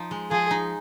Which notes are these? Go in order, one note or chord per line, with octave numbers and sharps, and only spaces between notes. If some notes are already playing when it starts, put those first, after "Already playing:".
Already playing: F3 D#4
G#3
F3 G#4
D#4